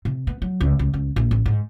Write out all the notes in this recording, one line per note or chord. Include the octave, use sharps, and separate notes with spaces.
C3
B3
F#3
C#2
C#2
C#2
A#1
A1
G#2